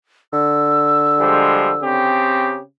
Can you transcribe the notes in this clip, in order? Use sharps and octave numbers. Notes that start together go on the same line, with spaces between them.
D3 E6
F3 G3 G#3
C#3 C4 G4